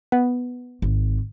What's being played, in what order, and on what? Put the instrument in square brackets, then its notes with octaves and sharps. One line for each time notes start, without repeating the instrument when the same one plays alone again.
[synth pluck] B3
[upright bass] G#1